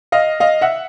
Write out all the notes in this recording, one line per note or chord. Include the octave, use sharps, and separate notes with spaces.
D#5 F5
D#5 F5
E5 F#5